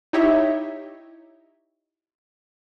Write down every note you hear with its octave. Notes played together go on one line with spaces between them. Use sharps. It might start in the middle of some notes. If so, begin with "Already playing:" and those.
D#4 E4 G4 C#5 D#5 E5